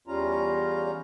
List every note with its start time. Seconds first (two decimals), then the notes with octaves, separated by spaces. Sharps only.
0.07 E2 G3 C#4 F4 A#5